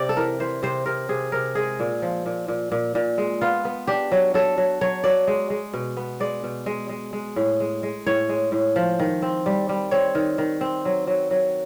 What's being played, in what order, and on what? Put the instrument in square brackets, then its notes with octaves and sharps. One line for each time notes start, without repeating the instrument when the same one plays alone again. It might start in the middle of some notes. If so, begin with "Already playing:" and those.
Already playing: [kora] C3 D5
A4
E3 A#4
E3 C5
C3 C5
C3 A#4
C3 G#4
C3 A#4
G#3 G#4
A#2
F3
A#2
A#2
A#2
A#2
G#3
B3 F4
B3
D4 G4
F#3
F#3 A4
F#3
F#3 C#5
F#3 D5
G#3
G#3
B2
B3
G#3 D5
B2
G#3
G#3
G#3
A2
G#3
G#3
A2 C#5
G#3
A2
F3
D#3
C4
G3
G3
C4 C#5
D#3
D#3
C4
F#3
F#3
F#3